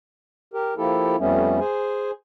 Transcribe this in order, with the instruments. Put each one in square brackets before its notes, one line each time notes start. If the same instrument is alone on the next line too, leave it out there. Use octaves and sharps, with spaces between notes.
[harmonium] G4 A#4
F3 A#3 E4 G4 A4
F2 G3 A3 B3 C#4
G#4 C5 G#5